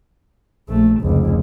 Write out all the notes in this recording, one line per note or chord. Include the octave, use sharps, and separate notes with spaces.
A#1 A3
F1 C#2